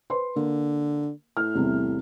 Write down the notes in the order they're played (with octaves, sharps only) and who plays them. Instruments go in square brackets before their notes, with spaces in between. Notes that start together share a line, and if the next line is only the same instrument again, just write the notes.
[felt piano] B4 C5 C6
[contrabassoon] D3 [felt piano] A#3
[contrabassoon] A2 [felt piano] F6
[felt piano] E2 C3 G3